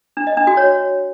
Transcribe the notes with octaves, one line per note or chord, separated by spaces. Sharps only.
D4
D#5
D4
F#4
C#5